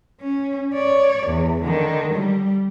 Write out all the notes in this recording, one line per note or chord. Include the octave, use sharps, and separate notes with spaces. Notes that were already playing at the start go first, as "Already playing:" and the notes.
C#4
C#5 D5
E2
D3 D#3
G3